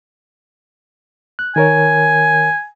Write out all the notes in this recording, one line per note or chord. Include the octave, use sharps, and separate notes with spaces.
F#6
D#3 A#4 C#5 G#5